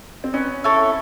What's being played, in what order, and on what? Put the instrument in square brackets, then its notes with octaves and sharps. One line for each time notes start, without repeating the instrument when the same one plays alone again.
[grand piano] C4
[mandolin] B3 [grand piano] C#4
[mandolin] E4 A4 C#5